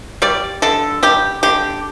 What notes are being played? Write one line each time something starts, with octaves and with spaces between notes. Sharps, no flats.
G3 D5
D3 A4
G3 G4
D3 G4